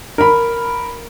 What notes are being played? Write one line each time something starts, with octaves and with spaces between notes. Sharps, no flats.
A#4 B5